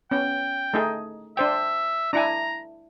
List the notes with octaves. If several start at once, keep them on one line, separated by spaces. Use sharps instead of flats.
B3 C#4 G5
A3 D#4 G#4
D4 C5 E5 G5
D4 E4 G#5 A#5